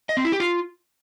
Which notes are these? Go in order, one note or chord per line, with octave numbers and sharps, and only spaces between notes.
D#5
C4
E4
G4
F4